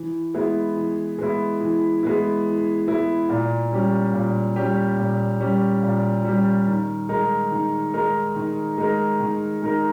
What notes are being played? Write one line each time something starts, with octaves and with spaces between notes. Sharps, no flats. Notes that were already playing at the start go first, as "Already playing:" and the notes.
Already playing: E3
G#3 B3 E4
E3
G#3 B3 E4
E3
G#3 B3 E4
E3
G#3 B3 E4
A#2
G3 C#4 G4
A#2
G3 C#4 G4
A#2
G3 C#4 G4
A#2
G3 C#4 G4
D#3
G#3 D#4 A#4
D#3
G#3 D#4 A#4
D#3
G#3 D#4 A#4
D#3
G#3 D#4 A#4